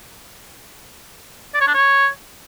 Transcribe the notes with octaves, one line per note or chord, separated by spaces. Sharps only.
D5
C#5
D4
C#5